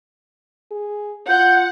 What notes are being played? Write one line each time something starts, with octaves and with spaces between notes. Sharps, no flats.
G#4
F4 F#5 G6